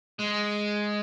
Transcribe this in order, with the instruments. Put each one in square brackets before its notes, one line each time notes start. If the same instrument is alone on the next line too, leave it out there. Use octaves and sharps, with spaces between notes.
[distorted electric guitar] G#3